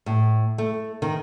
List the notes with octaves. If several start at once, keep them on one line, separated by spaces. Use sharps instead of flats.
A2
A3
D#3